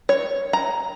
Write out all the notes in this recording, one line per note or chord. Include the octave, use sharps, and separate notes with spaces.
C#5
A#5